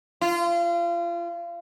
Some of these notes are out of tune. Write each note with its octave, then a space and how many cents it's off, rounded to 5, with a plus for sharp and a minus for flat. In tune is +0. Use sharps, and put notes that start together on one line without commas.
F4 -30